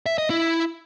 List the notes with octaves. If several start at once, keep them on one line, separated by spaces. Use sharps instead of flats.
E5
D#5
E4